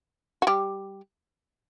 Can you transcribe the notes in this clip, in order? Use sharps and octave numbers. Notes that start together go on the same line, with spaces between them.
F#4
G3 G4